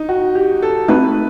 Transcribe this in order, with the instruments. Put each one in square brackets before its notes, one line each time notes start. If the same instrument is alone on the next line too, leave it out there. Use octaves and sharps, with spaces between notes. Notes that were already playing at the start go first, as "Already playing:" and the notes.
Already playing: [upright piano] D#4
F#4
G4
A4
[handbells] A3 C4 D#4 F#4 [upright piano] B4